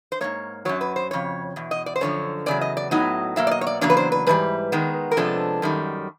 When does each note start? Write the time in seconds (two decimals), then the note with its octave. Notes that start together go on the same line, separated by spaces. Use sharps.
0.12 C5
0.21 G#2 F3 A#3 C#5
0.65 F#2 C#3 F#3 C#5
0.81 B4
0.96 C5
1.11 F2 C#3 C#5
1.56 E2 B2
1.71 D#5
1.86 D5
1.96 C5
2.01 F#2 D3 F3 C#5
2.46 E2 C#3 F#3 D5
2.61 D#5
2.77 D5
2.91 A2 F#3 B3 D#4 D#5
3.36 B2 F#3 A#3 E5
3.47 D5
3.51 D#5
3.61 C#5
3.67 D5
3.81 E2 C#3 F#3 A#3 D4 C#5
3.90 B4
3.97 C5
4.12 B4
4.27 G#2 E3 G3 B4
4.72 D#3 G#3 B3
5.11 A#4
5.17 C3 F3 G#3 B3 D4 A4
5.62 F#2 D#3 G3